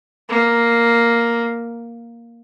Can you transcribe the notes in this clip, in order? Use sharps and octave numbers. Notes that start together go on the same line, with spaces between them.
A#3